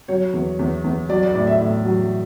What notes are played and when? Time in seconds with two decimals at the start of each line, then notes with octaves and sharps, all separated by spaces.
0.08 F#3 C#5
0.33 E2
0.59 E2
0.84 E2
1.09 F#3 D5
1.23 D5
1.35 A2 D5
1.47 E5
1.60 A2
1.85 F#3